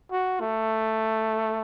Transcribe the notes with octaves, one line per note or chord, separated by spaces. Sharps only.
F#4
A3